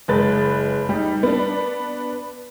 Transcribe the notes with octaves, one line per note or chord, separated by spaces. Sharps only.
F#1 G#3 B4 A6
G3 D#4
B3 D4